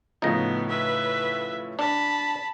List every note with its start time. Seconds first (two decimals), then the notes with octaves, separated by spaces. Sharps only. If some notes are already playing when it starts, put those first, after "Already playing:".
0.22 A2 C#3 F3 B3 D#4 D#5
0.69 B4 E5
1.79 D4 A5 B5